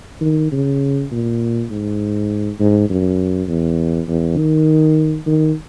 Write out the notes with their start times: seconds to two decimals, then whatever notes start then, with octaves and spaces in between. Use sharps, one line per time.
0.21 D#3
0.52 C#3
1.11 A#2
1.70 G#2
2.60 G#2
2.90 F#2
3.48 E2
4.08 E2
4.37 D#3
5.26 D#3